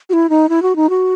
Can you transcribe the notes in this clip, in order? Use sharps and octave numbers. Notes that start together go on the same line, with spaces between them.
F#4
E4
D#4
E4
F#4
D#4
F#4